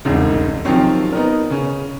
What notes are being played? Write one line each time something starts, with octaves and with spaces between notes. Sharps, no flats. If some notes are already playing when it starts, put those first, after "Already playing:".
E1 C2 G#2 C#3
C3 D#3 F3 F#3 C4 C#4
B3 D#4 A#4
C#3 C#4